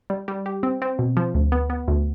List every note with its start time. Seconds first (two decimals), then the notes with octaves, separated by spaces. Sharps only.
0.10 G3
0.28 G3
0.46 G4
0.63 C4
0.82 C4
0.99 B2
1.17 F3
1.34 D2
1.52 B3
1.70 B3
1.88 D2